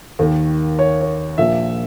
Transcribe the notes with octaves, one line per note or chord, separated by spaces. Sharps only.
D#2 D#3
C#5
C#5
A#1 A#2 E5